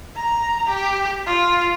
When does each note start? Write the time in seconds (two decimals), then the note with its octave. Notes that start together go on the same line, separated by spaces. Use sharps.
0.16 A#5
0.69 G4
1.26 F4